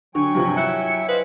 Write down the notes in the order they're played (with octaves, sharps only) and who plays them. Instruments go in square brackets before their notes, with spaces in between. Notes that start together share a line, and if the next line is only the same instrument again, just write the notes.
[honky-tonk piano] D3 [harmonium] F#3 G5 G#5 [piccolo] C#6
[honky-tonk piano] G2 C3 F3
[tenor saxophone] E4 [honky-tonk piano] F#6 [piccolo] C#7
[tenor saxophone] B4 [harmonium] C5 D#5 F5